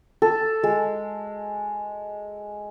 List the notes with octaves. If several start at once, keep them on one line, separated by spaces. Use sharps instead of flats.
A4
G#3